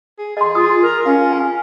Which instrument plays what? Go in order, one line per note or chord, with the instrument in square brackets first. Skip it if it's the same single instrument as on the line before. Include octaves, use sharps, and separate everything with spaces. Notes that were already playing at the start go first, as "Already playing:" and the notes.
[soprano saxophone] G#4
[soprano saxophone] G#4 [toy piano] D#5 C6
[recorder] F4 [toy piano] D#6
[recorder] A#4
[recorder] C#4 [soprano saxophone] F4
[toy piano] G#5